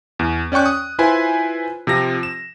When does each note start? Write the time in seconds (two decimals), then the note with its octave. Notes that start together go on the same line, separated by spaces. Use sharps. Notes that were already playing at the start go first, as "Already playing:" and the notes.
0.19 E2
0.52 C#4 D5 G5 C#6 F#6
0.66 D#6
0.99 E4 F4 B4 C5 G#5
1.87 C3 F3 C4 A#6
2.23 E7